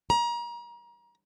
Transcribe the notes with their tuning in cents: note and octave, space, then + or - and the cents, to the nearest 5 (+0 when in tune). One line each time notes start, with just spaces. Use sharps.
A#5 +35